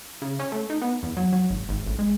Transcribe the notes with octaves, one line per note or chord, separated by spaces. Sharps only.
C#3
C#4
A3
D#4
B3
E2
F#3
F#3
G#1
G#1
A1
G#3